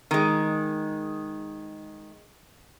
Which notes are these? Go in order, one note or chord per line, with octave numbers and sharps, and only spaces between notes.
D#3 G#3